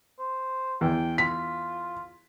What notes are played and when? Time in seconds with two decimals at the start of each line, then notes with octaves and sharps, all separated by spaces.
0.19 C5
0.81 E2 G5
1.18 F4 B6